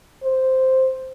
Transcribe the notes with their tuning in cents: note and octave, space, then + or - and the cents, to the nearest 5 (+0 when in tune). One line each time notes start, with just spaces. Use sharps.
C5 +0